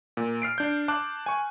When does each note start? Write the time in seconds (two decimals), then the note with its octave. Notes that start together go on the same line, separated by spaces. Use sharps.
0.17 A#2
0.42 F6 C7 D7
0.58 D4 G6
0.88 A5 D6 F#6
1.26 G#5 C#6